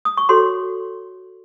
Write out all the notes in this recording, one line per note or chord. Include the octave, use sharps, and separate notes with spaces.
D#6
C#6
F#4 A4 C#5 C6